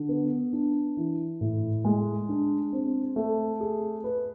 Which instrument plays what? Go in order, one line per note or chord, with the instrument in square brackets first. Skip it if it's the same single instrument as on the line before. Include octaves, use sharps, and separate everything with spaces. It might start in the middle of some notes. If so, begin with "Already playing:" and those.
Already playing: [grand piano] D3
B3
D4
E3
A2
G#3
D4
C4
A3
G#4
B4